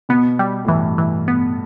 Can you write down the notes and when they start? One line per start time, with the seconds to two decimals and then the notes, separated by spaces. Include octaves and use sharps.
0.09 B2 B3
0.39 G3
0.65 A2
0.68 G2 E3
0.98 E3
1.28 B3